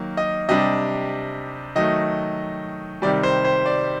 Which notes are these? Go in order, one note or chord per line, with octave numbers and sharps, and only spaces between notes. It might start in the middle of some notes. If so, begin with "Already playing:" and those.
Already playing: D#3 F#3 A#3
D#5
C3 G3 D4 D#5
D#3 F#3 A3 D#5
C3 D#3 G3 D5
C5
C5
D5